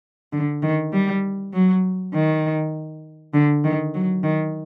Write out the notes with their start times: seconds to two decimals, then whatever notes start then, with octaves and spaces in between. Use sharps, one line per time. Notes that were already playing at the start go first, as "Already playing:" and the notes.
0.32 D3
0.62 D#3
0.92 G3
1.53 F#3
2.14 D#3
3.34 D3
3.64 D#3
3.94 F#3
4.23 D#3